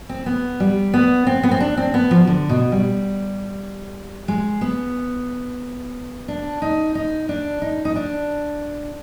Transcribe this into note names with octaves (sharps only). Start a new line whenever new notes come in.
C4
B3
G3
B3
C4
B3
C4
D4
C4
B3
F3
D3
B2
G3
G#3
B3
D4
D#4
D#4
D4
D#4
D#4
D4